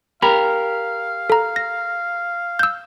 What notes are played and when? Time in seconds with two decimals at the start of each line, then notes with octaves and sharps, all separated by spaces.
0.22 G4 A#4 F5 B5
1.30 A4 A#5
1.56 A#6
2.59 E6 G6